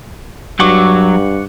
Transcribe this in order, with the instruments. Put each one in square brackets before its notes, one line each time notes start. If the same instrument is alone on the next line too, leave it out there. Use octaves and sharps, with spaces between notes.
[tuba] G2 [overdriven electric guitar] F#3 [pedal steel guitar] F#5 C#6 D6